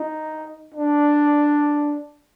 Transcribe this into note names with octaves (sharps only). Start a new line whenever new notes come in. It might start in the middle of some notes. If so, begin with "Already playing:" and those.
Already playing: D#4
D4